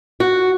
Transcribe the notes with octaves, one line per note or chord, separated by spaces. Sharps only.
F#4